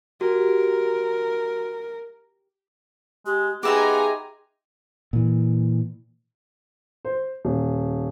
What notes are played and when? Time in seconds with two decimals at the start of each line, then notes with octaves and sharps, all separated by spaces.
0.21 F#4 G4 A#4
3.26 G#3 G4
3.63 B3 D#4 G4 G#4 E5 G#5 A#5 C6
5.13 A#2 E3
7.05 C5
7.45 D#1